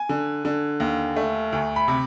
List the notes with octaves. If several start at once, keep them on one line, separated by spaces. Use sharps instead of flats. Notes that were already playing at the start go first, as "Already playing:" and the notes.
Already playing: G#5
D3
D3
D#2
A3
D2
B5
C3